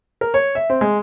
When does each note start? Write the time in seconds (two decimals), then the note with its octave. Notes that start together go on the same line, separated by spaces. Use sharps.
0.21 A#4
0.34 C#5
0.55 E5
0.70 C4
0.81 G#3